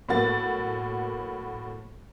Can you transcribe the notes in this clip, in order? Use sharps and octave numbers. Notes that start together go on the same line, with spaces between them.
A2 F#3 A#3 B3 F#4 A6